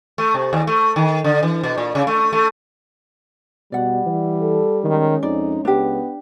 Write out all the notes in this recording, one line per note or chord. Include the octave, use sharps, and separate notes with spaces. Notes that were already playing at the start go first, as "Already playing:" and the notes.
A3
C3
D#2
A3
D#3
D3
E3
B2
A#2
C#3
A3
A3
B2 G3 D5 F#5
E3
A4
D#3 G#3 C#4
F2 D#4 D5
C#2 B3 D4 G4